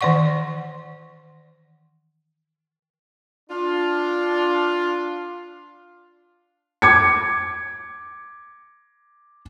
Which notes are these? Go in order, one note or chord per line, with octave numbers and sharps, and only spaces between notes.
D#3 E3 D5 F#5 C#6
D4 F4
D6 G#6 C#7